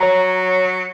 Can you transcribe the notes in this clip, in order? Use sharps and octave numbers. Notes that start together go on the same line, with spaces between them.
F#3 C#5 A#5